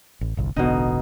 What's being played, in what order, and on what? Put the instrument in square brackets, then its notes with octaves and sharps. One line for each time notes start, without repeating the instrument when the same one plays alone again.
[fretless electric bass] A1
G1 C2
[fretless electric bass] E1 A1 D3 [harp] B2 D#4